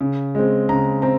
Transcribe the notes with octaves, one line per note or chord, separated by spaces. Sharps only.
C#3
G#3 C4
C#3 A#5
C4 A#5